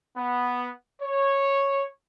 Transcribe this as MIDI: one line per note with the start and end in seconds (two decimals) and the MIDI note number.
0.17 0.69 59
1.02 1.86 73